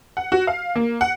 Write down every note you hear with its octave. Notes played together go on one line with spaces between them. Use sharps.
F#5
F#4
F5
A#3
F#5